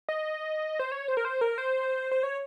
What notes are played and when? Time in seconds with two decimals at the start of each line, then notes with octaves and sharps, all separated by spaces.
0.09 D#5
0.79 C5
0.92 C#5
1.08 C5
1.17 A#4
1.25 C5
1.41 A#4
1.58 C5
2.11 C5
2.23 C#5